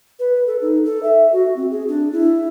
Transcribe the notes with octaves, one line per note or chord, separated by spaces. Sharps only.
B4
A4
D#4
A4
E5
F#4
C4
G#4
D4
E4